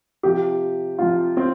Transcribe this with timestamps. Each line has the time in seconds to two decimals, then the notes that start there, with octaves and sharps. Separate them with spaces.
0.23 C3 F3 G4
0.99 C3 F3 F4
1.37 C4